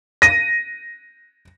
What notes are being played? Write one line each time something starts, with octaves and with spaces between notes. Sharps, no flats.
A#6 D#7